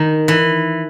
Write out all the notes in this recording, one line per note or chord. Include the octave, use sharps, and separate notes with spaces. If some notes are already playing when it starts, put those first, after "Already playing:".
Already playing: D#3
E3